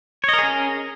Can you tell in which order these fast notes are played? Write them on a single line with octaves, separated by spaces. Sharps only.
C#5 D#5 A#4 G#4 C#4